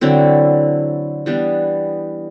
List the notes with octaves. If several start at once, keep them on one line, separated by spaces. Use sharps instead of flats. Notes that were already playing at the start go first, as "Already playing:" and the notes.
D3 F#3 C4 E4
E3 G3 B3 D4